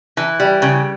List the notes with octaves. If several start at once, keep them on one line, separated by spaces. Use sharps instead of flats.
E3
G3
C#3